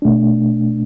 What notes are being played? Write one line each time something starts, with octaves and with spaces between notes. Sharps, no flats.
B2 A3 D4